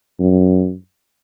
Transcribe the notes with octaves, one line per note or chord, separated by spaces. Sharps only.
F#2